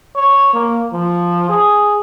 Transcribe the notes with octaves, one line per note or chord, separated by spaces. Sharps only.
C#5
A#3
F3
G#4